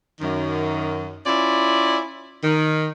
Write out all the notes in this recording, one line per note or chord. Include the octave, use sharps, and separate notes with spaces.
F#2 D#3
C#4 E4 F4 D5
D#3